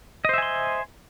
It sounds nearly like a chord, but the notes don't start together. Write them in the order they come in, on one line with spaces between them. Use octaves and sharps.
D#5 C5 E5 G#5 C6